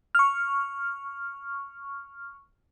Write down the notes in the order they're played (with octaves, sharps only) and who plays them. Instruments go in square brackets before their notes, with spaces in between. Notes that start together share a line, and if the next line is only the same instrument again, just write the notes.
[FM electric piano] C#6 F6